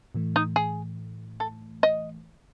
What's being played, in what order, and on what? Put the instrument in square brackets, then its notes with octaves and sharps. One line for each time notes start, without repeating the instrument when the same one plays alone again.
[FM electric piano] A2 E3 A3
[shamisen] D#4
G#4
A4
D#5